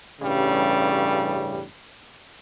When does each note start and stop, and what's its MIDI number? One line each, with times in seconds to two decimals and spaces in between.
0.21 1.63 33
0.21 1.63 43
0.21 1.63 49
0.21 1.63 55